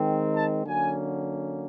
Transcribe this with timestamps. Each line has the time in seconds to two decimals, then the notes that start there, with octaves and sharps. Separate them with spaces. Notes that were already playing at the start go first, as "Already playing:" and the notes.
Already playing: D#3 G#3 C4
0.33 A5
0.64 D3 F#3 A#3 C#4 G#5